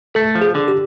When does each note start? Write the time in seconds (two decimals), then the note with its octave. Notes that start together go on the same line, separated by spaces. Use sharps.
0.15 A3 A4
0.35 F3
0.42 G#4
0.55 D3
0.68 G4